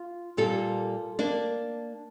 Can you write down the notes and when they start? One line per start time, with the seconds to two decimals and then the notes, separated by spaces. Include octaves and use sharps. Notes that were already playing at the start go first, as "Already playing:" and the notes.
Already playing: F4
0.37 A#2 G3 A#3 F4 A4
1.19 A#3 D4